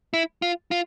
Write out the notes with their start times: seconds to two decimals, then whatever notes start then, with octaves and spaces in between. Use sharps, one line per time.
0.14 E4
0.42 F4
0.71 F4